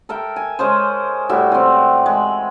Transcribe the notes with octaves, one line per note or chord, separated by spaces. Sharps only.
A4 A#4 E5 G5
G#5
G#3 C#4 G#4 C5
A2 G3 F#4 E5
E3 C4
G#3